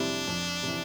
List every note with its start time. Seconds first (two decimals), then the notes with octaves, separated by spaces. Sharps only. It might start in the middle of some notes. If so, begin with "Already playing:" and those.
Already playing: F2 C3 G3 C4 D4 E4
0.28 F2
0.63 C3 E3